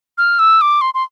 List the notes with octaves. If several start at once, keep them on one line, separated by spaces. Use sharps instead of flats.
F6
E6
D6
C6
C6